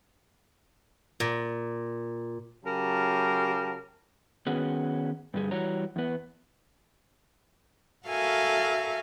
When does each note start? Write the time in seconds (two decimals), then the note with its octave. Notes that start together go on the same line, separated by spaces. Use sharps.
1.20 A#2
2.65 C#3 F#3 G4 A#4 A5
4.47 D#3 B3 C#4 F#4 G#4 B4
5.34 G2 D3 G3 G#4
5.51 E3 G3 F#4 C#5 A#5
5.96 E2 B3
8.07 F#4 A4 A#4 E5 F5 G#5